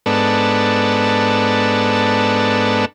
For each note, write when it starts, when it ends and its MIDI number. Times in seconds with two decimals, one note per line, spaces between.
0.06 2.85 44
0.06 2.85 59
0.06 2.85 62
0.06 2.85 69